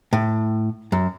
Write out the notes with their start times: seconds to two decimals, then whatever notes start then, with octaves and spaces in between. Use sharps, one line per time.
0.13 A2
0.92 F#2